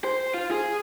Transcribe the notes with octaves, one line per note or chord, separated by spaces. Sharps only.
C5
F4
G#4